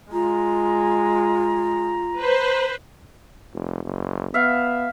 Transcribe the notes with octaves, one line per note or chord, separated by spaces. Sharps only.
G#3 F4 A#5
B4 C5
F1
F#1
B3 E5 F5